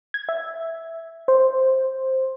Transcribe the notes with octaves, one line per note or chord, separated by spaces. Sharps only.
G#6
E5
C5